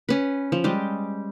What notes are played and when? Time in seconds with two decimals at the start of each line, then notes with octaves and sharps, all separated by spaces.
0.09 C#4 B4
0.52 F3
0.64 G3 G#3 G4